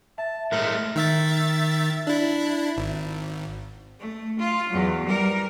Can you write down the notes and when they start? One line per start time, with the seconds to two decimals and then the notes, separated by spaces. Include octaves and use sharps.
0.18 E5 A5
0.52 A2 G#3 A3 A#4 F#6
0.95 D#3 E5 A6
2.07 D4 E4
2.77 G#1
4.00 A3
4.39 F4
4.70 E2 F#3
5.04 G3 A#4